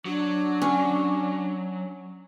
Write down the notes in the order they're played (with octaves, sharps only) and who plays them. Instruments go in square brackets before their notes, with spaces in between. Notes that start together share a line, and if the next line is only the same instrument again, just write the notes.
[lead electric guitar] F#3 [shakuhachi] D4
[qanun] C#4